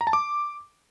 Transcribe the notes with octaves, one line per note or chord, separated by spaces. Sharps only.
A#5
A5
D6